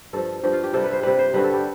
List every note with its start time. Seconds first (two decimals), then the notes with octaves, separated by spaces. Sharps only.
0.13 G2 F3 A4
0.43 G2 F3 G4
0.53 F4
0.64 G4
0.73 C3 G3 A4
0.84 B4
0.93 C5
1.03 C3 G3 B4
1.19 C5
1.34 G2 D3 G3 B4
1.44 A4
1.53 G4